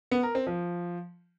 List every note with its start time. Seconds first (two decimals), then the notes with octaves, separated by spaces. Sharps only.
0.11 B3
0.23 A#4
0.35 C4
0.47 F3